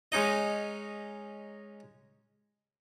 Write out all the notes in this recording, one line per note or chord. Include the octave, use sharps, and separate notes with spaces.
G#3 C#4 D#4 D#5